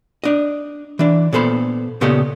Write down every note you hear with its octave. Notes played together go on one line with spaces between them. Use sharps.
D4 D#5
E3 D4
A#2 B3 A4 C5 B5
A#2 C#3 B3 G4 A4 D#5